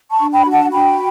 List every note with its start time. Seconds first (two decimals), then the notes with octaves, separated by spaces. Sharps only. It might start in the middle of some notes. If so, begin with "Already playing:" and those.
0.11 A5 C#6
0.18 D4
0.32 G5 B5
0.45 F#4
0.52 F#5 A5
0.72 D4 G5 B5